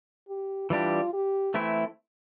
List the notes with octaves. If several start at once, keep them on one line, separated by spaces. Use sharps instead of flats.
G4
E3 G3 D4 F4 G4
G4
E3 A3 C4 E4